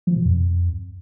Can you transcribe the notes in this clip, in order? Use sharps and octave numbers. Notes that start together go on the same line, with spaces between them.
F3
B2
F2